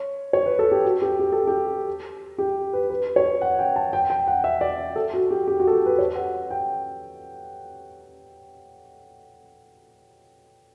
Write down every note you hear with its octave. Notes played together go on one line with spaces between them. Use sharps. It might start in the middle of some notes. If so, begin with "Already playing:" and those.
Already playing: C#5
C#5
B4
A4
G4
F#4
G4
G4
A4
G4
G4
B4
B4
C#5
F#5
G5
A5
G5
G5
F#5
E5
D5
A4
F#4
G4
G4
F#4
A4
G4
B4
C#5
F#5
G5